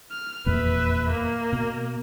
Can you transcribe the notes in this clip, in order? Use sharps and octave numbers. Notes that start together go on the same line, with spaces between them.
F6
F1 E2 A#2 B4 E5
A#3
B2